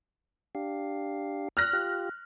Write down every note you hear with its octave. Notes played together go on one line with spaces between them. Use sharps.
D4 G4 F5
F6 F#6 A#6
F4 G4